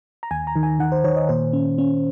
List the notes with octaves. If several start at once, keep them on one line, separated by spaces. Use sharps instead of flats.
A#5
D#2 G#5
A#5
D#3
G#5
D#3 F#5
C5
D#3 C#5
D#5
A#2 C5
C#4
C#4